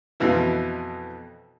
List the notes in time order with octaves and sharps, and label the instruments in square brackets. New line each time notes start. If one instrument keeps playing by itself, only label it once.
[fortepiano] F2 B2 E3 E4